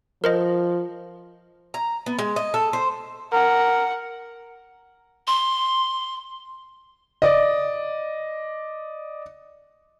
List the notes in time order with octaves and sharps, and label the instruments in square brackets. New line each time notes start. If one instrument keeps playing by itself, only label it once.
[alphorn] F3 [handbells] A#4 C5 D#5
[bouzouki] A#5
B3
G#3
D#5
A4
C5
[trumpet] A#4 [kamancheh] F#5
[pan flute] C6
[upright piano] D5 D#5